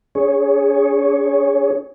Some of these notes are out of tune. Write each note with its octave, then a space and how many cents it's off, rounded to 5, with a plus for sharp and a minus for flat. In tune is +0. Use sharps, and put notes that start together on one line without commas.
D4 -45 G#4 +0 C#5 +0